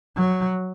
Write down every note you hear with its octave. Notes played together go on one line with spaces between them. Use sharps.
F#3